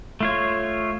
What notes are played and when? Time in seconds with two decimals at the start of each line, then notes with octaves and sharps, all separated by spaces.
0.20 A3 F4 C#5